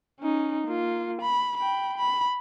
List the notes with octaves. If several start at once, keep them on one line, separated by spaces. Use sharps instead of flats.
C#4 D#4
A#3 F4
B5
G5 B5
B5